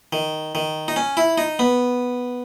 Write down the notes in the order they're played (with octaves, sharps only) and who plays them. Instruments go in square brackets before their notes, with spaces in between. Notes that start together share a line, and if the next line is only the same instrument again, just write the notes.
[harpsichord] D#3
D#3
D#4
C#4
E4
D#4
B3